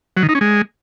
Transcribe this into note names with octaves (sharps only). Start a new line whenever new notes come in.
F#3
D#3
D#4
C#4
G#3